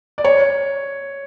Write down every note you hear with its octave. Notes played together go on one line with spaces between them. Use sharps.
D5
C#5